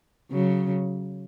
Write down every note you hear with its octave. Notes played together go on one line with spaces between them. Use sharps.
C#3 F#3